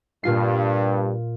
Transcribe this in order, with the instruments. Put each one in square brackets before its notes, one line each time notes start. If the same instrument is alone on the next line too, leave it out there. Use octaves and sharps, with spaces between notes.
[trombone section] G2 [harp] A#2 F4 C7